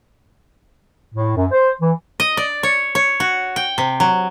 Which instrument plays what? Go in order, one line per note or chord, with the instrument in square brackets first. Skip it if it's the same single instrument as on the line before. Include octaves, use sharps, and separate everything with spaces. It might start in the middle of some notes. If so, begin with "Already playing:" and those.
[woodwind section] A2
F#2
C5
E3
[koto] D#5
D5
C#5
C#5
F#4
G5
C3
F#3